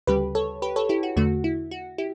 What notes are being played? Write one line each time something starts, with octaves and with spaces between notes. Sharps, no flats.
D2 C#3 G3 G4 B4
A4 C#5
G4 B4
A4 C#5
E4 G4
F#4
E2 D3 A3 F#4
E4
F#4
E4 G4